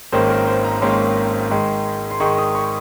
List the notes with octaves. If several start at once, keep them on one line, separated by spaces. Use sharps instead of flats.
G#1 G#2 D#3 A#3 C#4 C5
A#4
C5
A#5
G#1 G#2 D#3 A#3 C#4 C6
G#2 D#3 G#3
C6
G#2 D#3 G#3 C#6
D#6
C#6